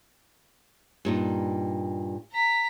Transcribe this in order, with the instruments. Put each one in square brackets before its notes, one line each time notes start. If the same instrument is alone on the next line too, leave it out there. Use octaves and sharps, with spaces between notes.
[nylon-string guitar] G2 A#2 D#4
[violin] A#5 B6